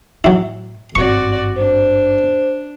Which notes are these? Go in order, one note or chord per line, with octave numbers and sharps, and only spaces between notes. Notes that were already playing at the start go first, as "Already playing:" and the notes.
A2 F#3 E4
G#1 G2 C4 F#4 D5 C#6
D4 C5